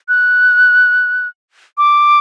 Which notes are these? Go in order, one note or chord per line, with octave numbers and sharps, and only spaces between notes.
F#6
D6